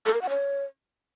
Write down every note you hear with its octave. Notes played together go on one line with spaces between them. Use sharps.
A4
A#4
F#5
C#5